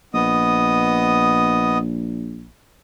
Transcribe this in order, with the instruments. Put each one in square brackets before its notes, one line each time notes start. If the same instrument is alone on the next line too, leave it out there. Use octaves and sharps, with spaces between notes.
[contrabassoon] A#1 [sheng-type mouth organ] B3 D#5 D#6